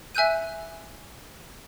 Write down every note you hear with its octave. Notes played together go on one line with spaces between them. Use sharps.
E5 G#5 E6 F#6 G6 D#7